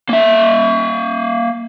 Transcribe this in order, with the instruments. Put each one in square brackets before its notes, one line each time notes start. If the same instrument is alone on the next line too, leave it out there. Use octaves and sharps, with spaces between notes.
[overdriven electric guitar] A#3 E5